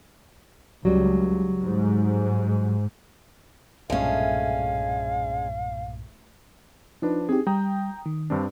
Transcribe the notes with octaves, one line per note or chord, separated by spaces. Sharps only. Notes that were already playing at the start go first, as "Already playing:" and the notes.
C#2 F#3 G3
G#2
B1 G2 A#2 G#3 A3 C#4 F5
F3 D4 D#4 B4
C4 D#4 G4 G#4
G3 G5 A#5 D#6
D#3
G2 C4 D4